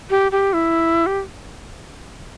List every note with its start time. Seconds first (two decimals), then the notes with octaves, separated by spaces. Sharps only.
0.10 G4
0.32 G4
0.53 E4
1.06 G4